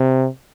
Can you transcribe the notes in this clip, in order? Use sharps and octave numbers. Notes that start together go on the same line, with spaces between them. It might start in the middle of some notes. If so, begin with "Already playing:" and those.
Already playing: C3